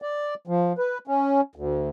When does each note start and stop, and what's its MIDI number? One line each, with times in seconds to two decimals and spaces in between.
0.02 0.34 74
0.47 0.73 53
0.78 0.98 71
1.08 1.41 61
1.56 1.89 38